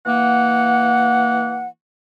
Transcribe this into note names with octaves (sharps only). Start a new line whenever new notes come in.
E3 A#3 F#5